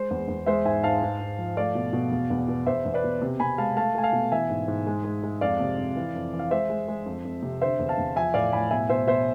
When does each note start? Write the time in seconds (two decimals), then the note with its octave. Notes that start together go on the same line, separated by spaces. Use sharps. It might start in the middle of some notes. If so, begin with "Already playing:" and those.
Already playing: G#3 C5
0.11 E2
0.28 E2
0.46 G#3 C5 E5
0.65 G#2 E5 G#5
0.83 G#2 F5 A5
1.02 G#2
1.20 G#2
1.38 F3
1.57 A3 D5 F5
1.75 B2
1.93 B2
2.11 E2
2.30 E2
2.48 B2
2.66 E2 C5 E5
2.85 E2
2.94 B4 D5
3.04 B2
3.22 C3
3.40 C3 G#5 B5
3.58 G#3 F5 A5
3.77 A3 F5 A5
3.95 A3 G#5
4.03 F5 A5
4.13 B2
4.32 E3 E5 G#5
4.49 G#2
4.68 G#2
4.87 G#3
5.04 G#3
5.23 G#3
5.41 F2 D5 F5
5.60 C3
5.78 F2
5.96 E3
6.15 F2
6.33 E3
6.39 F5
6.51 G#3 C5 E5
6.70 G#3
6.88 G#3
7.06 F2
7.25 F2
7.43 C3
7.61 D3 C5 E5
7.79 E2
7.89 F5 A5
7.98 E2
8.16 F3 E5 G#5
8.34 A2 D5 F5
8.52 A2 G#5 B5
8.70 B2 E5 G#5
8.89 B2 C5 E5
9.07 B2 C5 E5